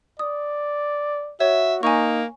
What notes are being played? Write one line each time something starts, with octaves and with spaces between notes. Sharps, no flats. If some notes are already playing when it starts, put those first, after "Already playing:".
D5 D#6
F#4 C#5 E5
A#3 D#4 G#5 C#6